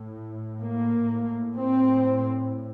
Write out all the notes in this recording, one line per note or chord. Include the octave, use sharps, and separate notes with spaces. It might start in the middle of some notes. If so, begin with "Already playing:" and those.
Already playing: A2
A#3
A2
C4